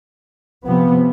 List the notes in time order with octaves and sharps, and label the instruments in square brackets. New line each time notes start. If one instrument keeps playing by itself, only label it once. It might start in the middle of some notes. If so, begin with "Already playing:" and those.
[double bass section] C3 F3 B3